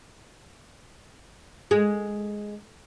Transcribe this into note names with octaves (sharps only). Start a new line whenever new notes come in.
G#3